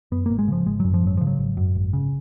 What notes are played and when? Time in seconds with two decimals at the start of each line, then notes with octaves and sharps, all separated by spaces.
0.12 F#2 B3
0.26 G#1 A#3
0.39 G#3
0.48 C#3 F3
0.66 G#1 G#3
0.80 F#2 F#3
0.94 F3
1.02 G#1 F#3
1.17 C#3 F3
1.27 F#3
1.38 G#1
1.57 F#2
1.75 G#1
1.93 C#3